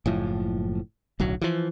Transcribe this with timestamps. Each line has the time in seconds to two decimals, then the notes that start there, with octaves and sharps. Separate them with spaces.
0.06 F#1 A2 F3
1.20 D1 B1 F#3
1.41 E3 F3